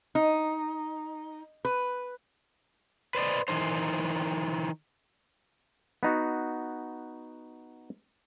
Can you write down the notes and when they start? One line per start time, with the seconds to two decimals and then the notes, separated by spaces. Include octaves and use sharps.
0.15 D#4
1.65 B4
3.15 B4 C5 D5 D#5
3.48 D#3 E3 D#4 C5
6.03 B3 D#4 F#4